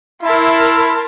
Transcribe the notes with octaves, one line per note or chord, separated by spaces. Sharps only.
E4 A#4 A5 C6